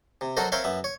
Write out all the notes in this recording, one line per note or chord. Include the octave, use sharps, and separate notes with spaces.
C3
F#3 F#4 A4 A#4 C5 D#5
C4 A#4 C#5 E5 F5 G5
F#2 B3 E5
C#5